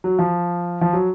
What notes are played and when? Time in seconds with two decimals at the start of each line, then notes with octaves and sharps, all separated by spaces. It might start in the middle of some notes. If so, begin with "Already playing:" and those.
0.04 F#3
0.19 F3
0.81 F3
0.93 F#3